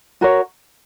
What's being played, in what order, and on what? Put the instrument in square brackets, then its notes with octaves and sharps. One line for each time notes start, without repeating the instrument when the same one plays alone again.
[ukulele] F#4 A#4 C#5